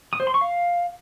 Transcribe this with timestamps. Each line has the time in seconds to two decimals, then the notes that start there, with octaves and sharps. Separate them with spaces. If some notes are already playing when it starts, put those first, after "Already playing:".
0.13 D#6
0.20 C5
0.27 C6
0.34 C#6
0.41 F5